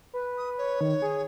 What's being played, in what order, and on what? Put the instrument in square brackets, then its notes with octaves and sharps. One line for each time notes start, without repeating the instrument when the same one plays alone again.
[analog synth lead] B4
[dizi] D#6
C#5
[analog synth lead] D#3
G#4